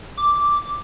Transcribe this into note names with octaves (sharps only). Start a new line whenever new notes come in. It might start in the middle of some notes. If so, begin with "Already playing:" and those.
D6